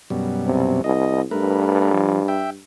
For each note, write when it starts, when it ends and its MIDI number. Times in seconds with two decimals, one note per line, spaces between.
0.10 0.82 42
0.10 0.82 47
0.10 0.82 55
0.46 0.83 48
0.84 1.23 36
0.84 1.22 75
1.31 2.63 43
1.31 1.92 57
1.31 1.92 70
1.31 1.92 71
1.92 2.21 53
2.28 2.50 76
2.28 2.50 79